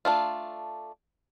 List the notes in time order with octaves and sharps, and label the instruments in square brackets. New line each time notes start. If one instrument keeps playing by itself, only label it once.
[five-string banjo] A3 D4 F4